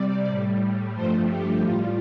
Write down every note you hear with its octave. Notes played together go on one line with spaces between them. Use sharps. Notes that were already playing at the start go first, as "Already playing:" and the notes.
Already playing: C3 G3 D5
A2 G3
G2 F3 A3 C5
G4
A2 G3 F4